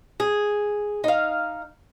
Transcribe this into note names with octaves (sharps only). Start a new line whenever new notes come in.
G#4
D#4 F5